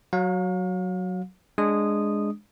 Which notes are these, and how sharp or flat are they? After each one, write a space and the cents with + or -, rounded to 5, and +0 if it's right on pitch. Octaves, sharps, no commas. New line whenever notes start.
F#3 +0 F5 +40
G#3 +0 D4 +5 D#6 -10